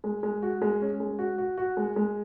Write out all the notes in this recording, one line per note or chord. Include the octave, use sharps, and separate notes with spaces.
G#3
G#3
F#4
G#3
C#4
G#3
F#4
F#4
F#4
G#3
G#3